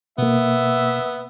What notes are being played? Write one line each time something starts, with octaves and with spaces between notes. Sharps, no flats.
B2 A#3 B3 E5